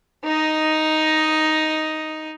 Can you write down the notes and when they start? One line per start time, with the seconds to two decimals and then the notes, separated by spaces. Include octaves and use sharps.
0.24 D#4 D#5